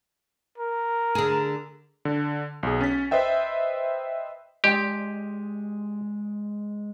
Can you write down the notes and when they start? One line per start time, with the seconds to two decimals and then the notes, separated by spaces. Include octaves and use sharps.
0.58 A#4
1.15 D3 G#4
2.05 D3
2.63 B1 G#4
2.81 C#4 A6 B6
3.11 B4 C5 D#5 E5 G5
4.64 G#3 G4 G#5